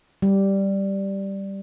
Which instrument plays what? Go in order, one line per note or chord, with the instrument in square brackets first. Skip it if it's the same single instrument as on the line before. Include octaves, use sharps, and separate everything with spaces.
[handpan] G3